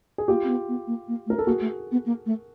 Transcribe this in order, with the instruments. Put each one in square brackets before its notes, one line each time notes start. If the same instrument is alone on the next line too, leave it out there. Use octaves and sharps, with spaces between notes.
[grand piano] G#4
[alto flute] A#3 [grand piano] F4 G4
[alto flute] C4
B3
B3
A#3
A#3
A3
[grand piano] A#4
A4
[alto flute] A#3 [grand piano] F#4 G#4
[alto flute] A3
B3
A#3
A3